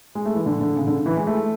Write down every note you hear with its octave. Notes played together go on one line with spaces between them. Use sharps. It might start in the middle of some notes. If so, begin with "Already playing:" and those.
G#3
A3
E3
D3
D3
C#3
D3
E3
G#3
A3